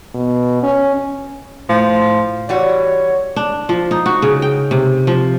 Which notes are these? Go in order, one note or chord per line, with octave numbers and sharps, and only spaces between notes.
B2
C#4
A2 F3
E3 G3 F#4 C#5
D4
F3
D#4
F#4
C#3
G5
C3
F3